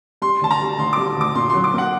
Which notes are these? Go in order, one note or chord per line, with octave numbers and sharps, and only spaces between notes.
G3 C6
D2 A5
A#5
G3
D2 C6
G3 D6
D2 D6
A#2 C6
F#3 C6
D6
A#3 F#5